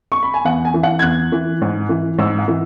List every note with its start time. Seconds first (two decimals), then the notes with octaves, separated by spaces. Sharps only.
0.12 C#6
0.23 B5
0.34 G#5
0.44 E2 F#5
0.65 G#5
0.74 E3
0.83 F#5
0.99 G#6
1.02 E2 F#6
1.32 E3
1.61 G#2
1.89 E3
2.18 G#2 E6
2.38 F#5
2.48 E3